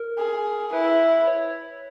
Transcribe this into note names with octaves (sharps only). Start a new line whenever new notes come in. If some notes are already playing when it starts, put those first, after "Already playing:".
Already playing: A#4
G#4
E4 B4
C#5